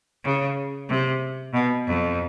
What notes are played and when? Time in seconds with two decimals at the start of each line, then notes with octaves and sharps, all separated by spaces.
0.24 C#3
0.89 C3
1.54 B2
1.87 F2